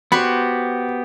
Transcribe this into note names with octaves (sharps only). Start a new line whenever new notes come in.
B3 F#4 G4 C5 B5